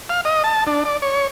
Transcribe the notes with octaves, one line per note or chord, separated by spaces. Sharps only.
F5
D#5
A5
D4
D5
C#5